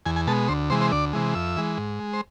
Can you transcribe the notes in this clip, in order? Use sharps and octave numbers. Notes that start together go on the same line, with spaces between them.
E2 G#5
G#5
B2 G#3 A5
D2 C5
C3 E3 G#3 C5
C5
D2 D5
C3 E3 G#3
F2 E5
E3 G#3
G#2
G#3
C5